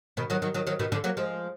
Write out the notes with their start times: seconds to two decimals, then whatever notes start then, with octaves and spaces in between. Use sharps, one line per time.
0.17 B2 D#3
0.30 D#3 F#3
0.42 D#3 F#3
0.54 D#3 F#3
0.67 D#3 F#3
0.79 B2 D#3
0.92 D3 F3
1.04 F#3 A#3
1.17 F3 G#3